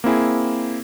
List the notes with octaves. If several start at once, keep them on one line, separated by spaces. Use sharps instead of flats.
A#3 C4 E4 G#4